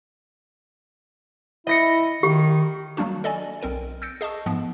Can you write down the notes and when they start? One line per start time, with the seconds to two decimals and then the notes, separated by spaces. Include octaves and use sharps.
1.67 E4 D#5 A#6 C#7
2.23 D#3 G4
2.97 F#3 G3 A#3 D4 F#4
3.24 A4 D5 D#5 G#5
3.61 B1 C4 A#4 D7
4.02 E6 G6 A6 A#6 C#7 D7
4.21 G#4 D#5 A5 C#6 E6
4.46 G#2 F3 B3